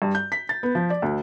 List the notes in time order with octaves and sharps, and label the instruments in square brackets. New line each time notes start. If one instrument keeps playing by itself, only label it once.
[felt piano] G2
G6
B6
A6
B3
F3
D5
D2